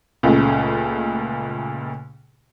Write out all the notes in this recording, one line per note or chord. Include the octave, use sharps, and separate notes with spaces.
C#2 A#2 C#3 A3